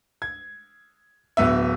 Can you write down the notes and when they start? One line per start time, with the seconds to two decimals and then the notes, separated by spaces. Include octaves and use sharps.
0.22 G#6
1.37 D1 B3 E5